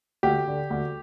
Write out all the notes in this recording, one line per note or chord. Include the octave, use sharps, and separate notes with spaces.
D2 G4
D3
D2